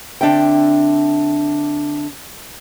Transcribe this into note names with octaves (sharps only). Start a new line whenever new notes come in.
D3 C4 D4 E5 G5